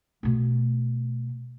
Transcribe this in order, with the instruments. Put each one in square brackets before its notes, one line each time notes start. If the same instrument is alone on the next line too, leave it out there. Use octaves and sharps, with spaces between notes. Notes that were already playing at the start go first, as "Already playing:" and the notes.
[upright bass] B2 A3